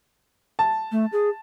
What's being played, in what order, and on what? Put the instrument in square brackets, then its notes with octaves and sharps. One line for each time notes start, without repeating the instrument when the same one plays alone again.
[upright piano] A5
[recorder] A3
G#4